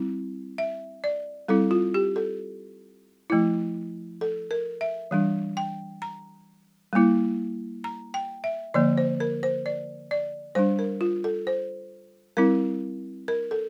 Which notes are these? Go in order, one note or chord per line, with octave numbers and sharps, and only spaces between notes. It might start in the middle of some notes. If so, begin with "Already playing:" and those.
Already playing: G3 C4 E4
E5
D5
G3 C4 E4 A4
F4
G4
A4
F3 A3 E4
A4
A#4
E5
E3 G3 D4
G5
A#5
G3 A#3 E4
A#5
G5
E5
D3 F3 A#3 D5
C5
A#4
C5
D5
D5
G3 D4 C5
A#4
F4
A4
C5
G3 C4 E4 A#4
A#4
A4